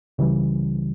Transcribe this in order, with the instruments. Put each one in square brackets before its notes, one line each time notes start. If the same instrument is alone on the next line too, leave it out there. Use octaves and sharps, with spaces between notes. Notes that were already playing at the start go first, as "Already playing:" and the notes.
[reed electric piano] C#2 C#3 E3 G3